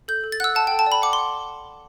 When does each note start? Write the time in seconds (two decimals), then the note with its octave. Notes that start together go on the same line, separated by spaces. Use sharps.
0.08 A4 G6
0.24 A4
0.32 A6
0.40 F#5 E6 F#6
0.55 F#5 A5
0.67 A4 G5
0.79 A5
0.86 D5
0.92 B5
1.02 F#5 D6
1.13 C6
1.18 F#5